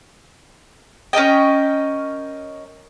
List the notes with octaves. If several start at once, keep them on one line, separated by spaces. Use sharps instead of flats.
C#4 A#4 D#5 G5